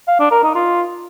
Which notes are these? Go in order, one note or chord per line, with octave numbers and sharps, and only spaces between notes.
F5
D4
A#4
D#4
F4